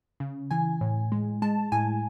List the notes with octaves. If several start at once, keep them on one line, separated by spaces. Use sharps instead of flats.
C#3
E3 G#5
A2
G#3
G#3 A5
A2 G#5